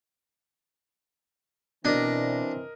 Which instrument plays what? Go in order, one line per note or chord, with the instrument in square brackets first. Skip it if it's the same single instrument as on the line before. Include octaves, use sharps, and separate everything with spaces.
[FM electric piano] B2 D5 A#6 [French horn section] E3 C4 [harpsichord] D4 [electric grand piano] A#4 D#5